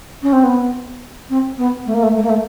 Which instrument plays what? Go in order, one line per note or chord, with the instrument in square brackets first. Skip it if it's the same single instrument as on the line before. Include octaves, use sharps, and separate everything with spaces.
[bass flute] C#4
C4
B3
C4
B3
A3
A#3
A3
A3
A#3
A3